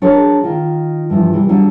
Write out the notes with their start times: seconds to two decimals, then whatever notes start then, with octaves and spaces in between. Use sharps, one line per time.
0.02 F#3 D4 G#4 A#4 C#5
0.43 D#3 F4
1.10 G2 E3 F3 G3
1.33 C3 E3 G3
1.49 D3 F#3 G3